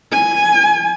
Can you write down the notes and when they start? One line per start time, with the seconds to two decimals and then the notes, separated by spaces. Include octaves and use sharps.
0.12 G#5